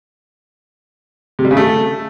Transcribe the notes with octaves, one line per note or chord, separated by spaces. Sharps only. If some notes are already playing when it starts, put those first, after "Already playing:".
C3
G3
C#3
A3